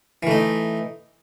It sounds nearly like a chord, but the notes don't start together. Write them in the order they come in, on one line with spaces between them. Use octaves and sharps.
E3 A3 D#4